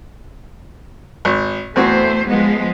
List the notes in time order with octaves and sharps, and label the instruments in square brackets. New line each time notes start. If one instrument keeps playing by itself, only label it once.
[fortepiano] G#1
[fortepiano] E2 C4 F#4 [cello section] A3 C5
[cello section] F3 G#3 B3